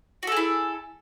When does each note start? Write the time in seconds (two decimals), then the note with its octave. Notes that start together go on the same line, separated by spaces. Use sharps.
0.23 F#4
0.27 A4
0.32 G#4
0.37 E4